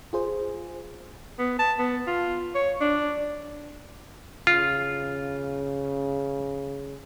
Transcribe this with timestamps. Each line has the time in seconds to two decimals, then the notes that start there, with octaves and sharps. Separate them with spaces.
0.13 F4 G#4 C5
1.39 B3
1.59 A5
1.79 B3
2.07 F4
2.55 C#5
2.81 D4
4.47 C#3 F4